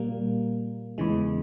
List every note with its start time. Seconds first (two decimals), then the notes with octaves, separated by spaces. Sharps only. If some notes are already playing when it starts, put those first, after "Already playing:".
Already playing: A#2 G3 A#3
0.98 E2 C#3 E3 G#3